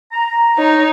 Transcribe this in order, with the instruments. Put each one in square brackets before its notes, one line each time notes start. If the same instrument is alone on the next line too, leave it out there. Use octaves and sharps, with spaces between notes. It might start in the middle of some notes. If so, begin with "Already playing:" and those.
[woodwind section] A#5
[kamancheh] D#4 C#5